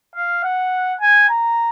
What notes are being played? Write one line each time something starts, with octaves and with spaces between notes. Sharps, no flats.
F5
F#5
G#5
A#5